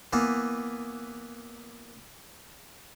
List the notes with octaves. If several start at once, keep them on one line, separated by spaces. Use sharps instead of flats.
E3 A#3 B3